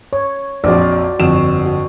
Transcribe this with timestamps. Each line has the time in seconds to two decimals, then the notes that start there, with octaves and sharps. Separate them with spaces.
0.13 C#5
0.64 A#1 F2 F#4 C5 D5
1.20 G1 F2 F#4 E7
1.66 F#4